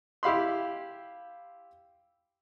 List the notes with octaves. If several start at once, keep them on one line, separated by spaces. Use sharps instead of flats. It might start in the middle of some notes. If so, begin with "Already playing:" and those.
E4 G4 F5 B5 C6